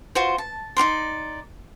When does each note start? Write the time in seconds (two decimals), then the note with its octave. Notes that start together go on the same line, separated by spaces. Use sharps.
0.15 F4 F#4 C5
0.38 A5
0.77 D#4 F4 D5 C6